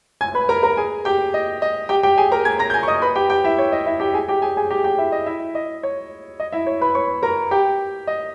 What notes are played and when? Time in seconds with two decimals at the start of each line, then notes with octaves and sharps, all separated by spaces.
0.21 G#5 G#6
0.35 B4 B5
0.49 A#4 A#5
0.63 A#4 A#5
0.77 G#4 G#5
1.05 G4 G5
1.34 D#5
1.62 D#5
1.89 G4 G5
2.03 G4 G5
2.18 G#4 G#5
2.32 A#4 A#5
2.45 G#5 G#6
2.59 A#5 A#6
2.70 G6
2.74 G#5 G#6
2.83 C#6
2.88 D#5 D#6
3.02 B4 B5
3.15 G4 G5
3.30 G4 G5
3.44 E4 E5
3.58 C#5
3.72 D#5
3.86 E4 E5
4.00 G4 G5
4.14 G#4 G#5
4.28 G4 G5
4.42 G#4 G#5
4.57 G#4 G#5
4.71 G4 G5
4.84 G4 G5
4.98 E4 E5
5.12 D#5
5.26 E4 E5
5.55 D#5
5.83 C#5
6.40 D#5
6.52 E4 E5
6.67 C#5
6.81 B4 B5
6.95 C#5 C#6
7.23 A#4 A#5
7.51 G4 G5
8.07 D#5